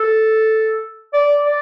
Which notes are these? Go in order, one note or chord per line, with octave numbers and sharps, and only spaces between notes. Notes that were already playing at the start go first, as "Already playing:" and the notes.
Already playing: A4
D5
D5